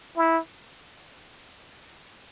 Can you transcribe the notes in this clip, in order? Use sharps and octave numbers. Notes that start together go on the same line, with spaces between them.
E4